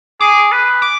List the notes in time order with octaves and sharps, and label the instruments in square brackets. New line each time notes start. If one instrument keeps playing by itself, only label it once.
[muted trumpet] G#4 [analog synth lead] D6
[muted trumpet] B4
[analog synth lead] D6